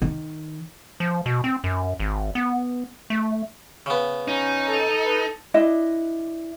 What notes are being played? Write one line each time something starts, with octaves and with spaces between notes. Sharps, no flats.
D#3
F3
B2
C4
F#2
G#1
B3
A3
C#3 B3
C#4 D#4
A4
B4
D4 E4 D#5